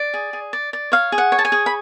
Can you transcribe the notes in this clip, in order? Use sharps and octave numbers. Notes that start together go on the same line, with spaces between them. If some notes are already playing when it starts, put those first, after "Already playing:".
Already playing: D5
G#4
G#4
D5
D5
C#5 F5
G#4
F#5
C#5
A5
G#5
G#4
B5